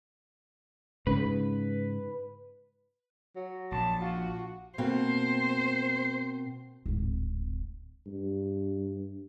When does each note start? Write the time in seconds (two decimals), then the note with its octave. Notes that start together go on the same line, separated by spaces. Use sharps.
1.07 G#2 C#3 B4
3.36 F#3
3.72 A#1 A5
4.01 F4 F#4
4.78 B2 A#3 C4 C5
6.86 D1 G#1
8.07 G2